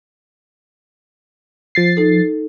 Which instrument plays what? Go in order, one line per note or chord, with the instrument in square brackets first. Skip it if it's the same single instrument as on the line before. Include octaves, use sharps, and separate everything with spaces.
[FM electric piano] F3 A6 C7
[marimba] D#4 A4